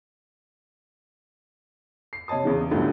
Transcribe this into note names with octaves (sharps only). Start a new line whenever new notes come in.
C7
C3 C#5 D#5 A5 D#6
E2 C#3 E3
B1 F#2 A2 D3 F3 G3